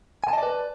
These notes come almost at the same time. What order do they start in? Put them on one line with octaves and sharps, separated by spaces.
G#5 A5 D#5 D5 B4